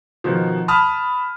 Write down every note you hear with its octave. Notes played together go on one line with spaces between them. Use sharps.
B2 D#3 F3
A5 B5 D#6 F6